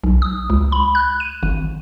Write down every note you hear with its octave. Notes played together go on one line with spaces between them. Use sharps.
B1
D#6
C#2
B5
F#6
D#7
G#1